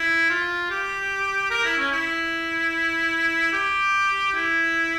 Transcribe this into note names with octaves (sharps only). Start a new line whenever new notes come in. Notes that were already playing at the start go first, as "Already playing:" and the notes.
Already playing: E4
F4
G4
A#4
E4
C#4
E4
G4
E4